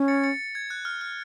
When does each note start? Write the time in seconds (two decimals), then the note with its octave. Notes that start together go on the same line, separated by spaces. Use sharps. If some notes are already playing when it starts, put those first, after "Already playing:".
Already playing: C#4
0.08 A6 C#7
0.23 A6 C#7
0.55 G#6
0.70 F#6
0.85 F6
1.01 F6